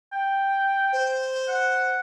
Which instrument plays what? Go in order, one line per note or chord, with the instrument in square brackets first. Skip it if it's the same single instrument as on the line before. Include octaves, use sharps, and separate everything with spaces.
[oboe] G5
[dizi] C5
[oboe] F#5